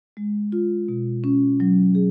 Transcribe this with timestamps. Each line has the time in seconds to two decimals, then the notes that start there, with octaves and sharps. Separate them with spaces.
0.17 G#3
0.52 F4
0.89 B2
1.24 C#4
1.60 F#3
1.95 G#4